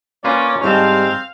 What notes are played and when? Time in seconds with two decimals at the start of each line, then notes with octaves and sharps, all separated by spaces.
0.24 A#3 C#4 F4 B4 D5
0.64 G#2 G3 C4 F5 A5